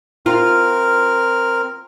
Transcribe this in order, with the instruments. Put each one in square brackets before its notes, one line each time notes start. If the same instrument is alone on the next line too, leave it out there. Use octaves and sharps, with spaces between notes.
[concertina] C4 A#4 F6 [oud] F4